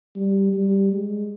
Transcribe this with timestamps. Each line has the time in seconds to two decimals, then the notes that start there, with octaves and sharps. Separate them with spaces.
0.16 G3
0.53 G3
0.92 G#3